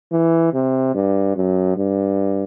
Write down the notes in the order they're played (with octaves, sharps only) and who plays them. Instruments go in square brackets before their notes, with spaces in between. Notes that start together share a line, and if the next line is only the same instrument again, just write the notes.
[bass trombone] E3
C3
G2
F#2
G2